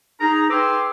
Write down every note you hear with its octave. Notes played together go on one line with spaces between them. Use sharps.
D#4 G#4 A#5
G#4 B4 G5 C6 D6 E6